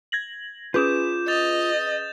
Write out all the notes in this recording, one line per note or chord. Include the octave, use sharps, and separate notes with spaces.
G#6 A#6 F#7
C#4 F4 G#4 B4 D6 D#6 G6 E7
D#5 G6 A6 F7